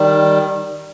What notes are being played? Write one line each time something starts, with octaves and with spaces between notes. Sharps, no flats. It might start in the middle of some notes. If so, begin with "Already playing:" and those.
Already playing: D#3 G3